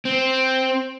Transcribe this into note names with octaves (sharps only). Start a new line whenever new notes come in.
C4